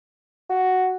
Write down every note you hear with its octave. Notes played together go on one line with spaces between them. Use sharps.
F#4